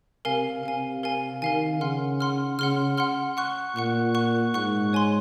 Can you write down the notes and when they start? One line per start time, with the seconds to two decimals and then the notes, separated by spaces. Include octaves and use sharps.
0.25 C3 A#4 F5 G#5
0.63 C3 A#4 F5 G#5
1.03 A#4 F5 G#5
1.42 D#3 A#4 F5 G#5
1.80 C#3 F#5 C6 F6
2.20 F#5 C6 F6
2.59 C#3 F#5 C6 F6
2.98 F#5 C6 F6
3.37 F#5 C#6 F#6
3.76 A#2 F#5 C#6 F#6
4.15 F#5 C#6 F#6
4.54 G#2 F#5 C#6 F#6
4.93 C#5 G#5 C6